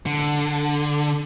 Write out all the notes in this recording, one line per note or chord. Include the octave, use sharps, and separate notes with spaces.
D3